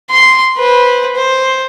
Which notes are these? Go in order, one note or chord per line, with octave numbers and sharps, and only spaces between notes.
C6
B4 C5
C5